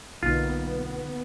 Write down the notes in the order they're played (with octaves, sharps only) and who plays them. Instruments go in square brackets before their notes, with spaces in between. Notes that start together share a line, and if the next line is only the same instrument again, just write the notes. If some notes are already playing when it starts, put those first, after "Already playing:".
[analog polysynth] B1 [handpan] D3 A#3 D#4 [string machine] B3 [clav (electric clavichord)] F4